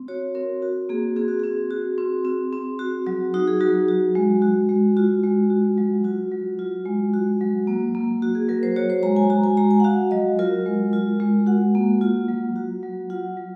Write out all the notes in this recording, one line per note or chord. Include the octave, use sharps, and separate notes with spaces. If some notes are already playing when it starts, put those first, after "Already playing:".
Already playing: C4
F#4 C#5
C4 A#4
F#4
A#3 G#4
C4 G#4
F#4
C4 G#4
F#4
C4
C4
C4
F#4
F#3
D#4 F#4
G#4
F#3 F#4
F#4
G#3
F#4
G#3
F4 F#4
G#3
F#4
F#3
F4 F#4
F#3
F4
G#3
F#4
F#3
A#3
A#3
F#4
G#4
F#3 A#4
C5
F#4 C#5
C5
G#3 A#5
G#5
F#4 A#5
G#5
G#3 A#5
G#5
F#5
F#4 F5
F#3 D#5
F4 A#4
G#3
F4
G#3
F#4 F#5
A#3
F4
F#3
F#4
F#3
F4 F#5
F#3